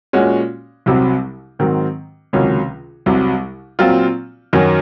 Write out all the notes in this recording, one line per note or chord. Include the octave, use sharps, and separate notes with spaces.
A#2 G#3 C#4 F#4
C2 C3 F#3 C4
G#2 D#3 F#3 C4
C#2 C3 D#3 F#3 C#4
C2 C3 F#3
A#2 F#3 C4 F4
F#2 D#3 F#3 C#4